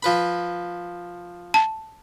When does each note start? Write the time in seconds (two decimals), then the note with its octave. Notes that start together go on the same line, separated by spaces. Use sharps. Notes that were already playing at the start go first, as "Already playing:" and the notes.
0.03 F3 B4 B5
1.54 A5